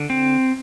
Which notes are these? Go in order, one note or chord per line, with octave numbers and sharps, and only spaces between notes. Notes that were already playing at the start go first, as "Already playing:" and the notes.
Already playing: D3
C4